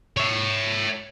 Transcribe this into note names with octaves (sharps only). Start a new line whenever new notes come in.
C#5 E5